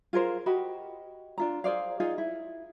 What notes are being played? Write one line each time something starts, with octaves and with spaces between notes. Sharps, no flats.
F4 G#4 A#4 C5
F#4 G4 D#5 B5
D4 F4 A#5
G#4 C5 D5 F5
D#4 F4 G#4
E4